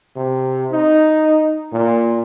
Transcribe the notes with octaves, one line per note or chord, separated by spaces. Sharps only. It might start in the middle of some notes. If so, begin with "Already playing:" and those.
C3
D#4
A#2